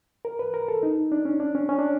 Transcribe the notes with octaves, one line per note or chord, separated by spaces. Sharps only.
A#4
B4
A#4
A4
D#4
D4
C#4
D4
C#4
C#4
D4